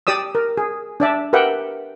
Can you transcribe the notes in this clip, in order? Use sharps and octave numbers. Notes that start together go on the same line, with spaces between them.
G4 D5 D#6 E6
A#4
G#4
D4 D5 E5
G4 A#4 B4 E5 F#5 G5